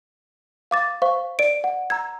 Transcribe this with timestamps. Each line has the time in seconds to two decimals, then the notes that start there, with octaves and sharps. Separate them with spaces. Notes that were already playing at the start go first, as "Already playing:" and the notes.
0.71 F5 D6 A6
1.02 C5 F5 C#6
1.39 D5 D7
1.64 F#5
1.90 A#5 E6 G#6